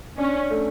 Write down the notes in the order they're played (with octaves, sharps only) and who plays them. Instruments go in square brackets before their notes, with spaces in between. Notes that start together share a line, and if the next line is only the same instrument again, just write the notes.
[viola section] C#4 [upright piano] D4
[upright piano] A3